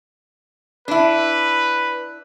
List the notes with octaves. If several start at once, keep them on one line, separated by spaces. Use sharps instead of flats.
D4 E4 B4